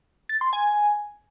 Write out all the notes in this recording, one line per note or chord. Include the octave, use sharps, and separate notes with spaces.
A6
C6
G#5